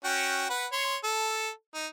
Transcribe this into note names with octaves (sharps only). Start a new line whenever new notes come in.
C#4 F#4 G5
B4 F#5
C#5 C6
A4
D#4